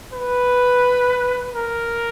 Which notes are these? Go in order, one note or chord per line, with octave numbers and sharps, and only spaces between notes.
B4
A#4